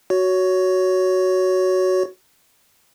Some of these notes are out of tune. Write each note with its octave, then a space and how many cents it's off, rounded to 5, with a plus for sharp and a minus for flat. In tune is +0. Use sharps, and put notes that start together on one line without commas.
F#4 +5 C#5 +15